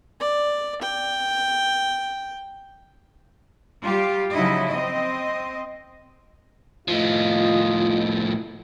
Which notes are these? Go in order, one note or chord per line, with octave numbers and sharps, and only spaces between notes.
D5
G5
G3 F4 G4
C#3 F3 F#3 D#4 E4 D#5
C4 D#5
A2 F3 F4 D#5